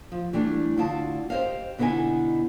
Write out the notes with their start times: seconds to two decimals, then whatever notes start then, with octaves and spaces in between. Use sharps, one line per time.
0.12 F3
0.33 E3 G3 A3 D4
0.78 D2 E4 F4 D5 A5
1.30 G4 C5 C#5 D#5 F5
1.79 B2 D3 B3 D#4 E4 G#5